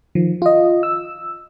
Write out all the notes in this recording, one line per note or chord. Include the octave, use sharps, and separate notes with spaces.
D#3 F3
F4 D#5
E6